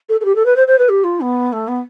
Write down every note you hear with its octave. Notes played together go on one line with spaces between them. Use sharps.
A4
A4
G4
A4
B4
C5
C5
B4
G4
F4
B3
A3
B3